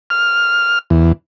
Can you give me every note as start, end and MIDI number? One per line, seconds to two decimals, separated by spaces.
0.10 0.79 89
0.90 1.12 40